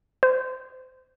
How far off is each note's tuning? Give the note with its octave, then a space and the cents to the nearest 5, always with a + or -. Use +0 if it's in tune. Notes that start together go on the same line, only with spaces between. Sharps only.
C5 -25